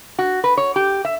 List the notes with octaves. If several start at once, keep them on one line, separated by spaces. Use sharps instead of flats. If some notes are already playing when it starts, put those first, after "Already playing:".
F#4
B4
C#5
G4
E5